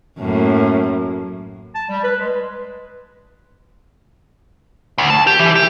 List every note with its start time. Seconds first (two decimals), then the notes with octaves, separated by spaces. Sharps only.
0.18 F#2 A2 A#3
1.74 A5
1.89 G3
2.03 B4
2.18 G#3
4.98 D2
5.10 A5
5.27 G4
5.39 E3
5.55 G4